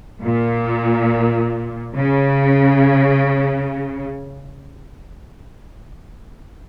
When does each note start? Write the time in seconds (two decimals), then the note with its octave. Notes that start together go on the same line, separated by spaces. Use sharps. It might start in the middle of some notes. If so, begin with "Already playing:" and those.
0.22 A#2
1.96 C#3